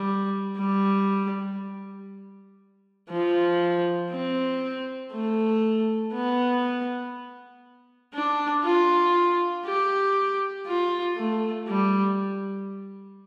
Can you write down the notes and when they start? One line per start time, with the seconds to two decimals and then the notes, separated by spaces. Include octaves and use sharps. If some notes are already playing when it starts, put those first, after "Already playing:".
Already playing: G3
0.58 G3
3.10 F3
4.11 C4
5.12 A3
6.13 B3
8.14 D4
8.64 F4
9.65 G4
10.67 F4
11.17 A3
11.67 G3